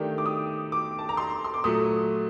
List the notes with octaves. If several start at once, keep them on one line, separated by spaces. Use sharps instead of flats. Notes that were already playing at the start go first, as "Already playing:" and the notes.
Already playing: D#3 A3 D4 G4
D6
D#6
D6
A5
A#5
C6
C6
D6
A#2 F#3 A3 D#6